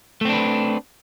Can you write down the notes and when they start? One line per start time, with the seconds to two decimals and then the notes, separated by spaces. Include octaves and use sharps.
0.21 A3
0.25 C4
0.29 D4
0.33 B4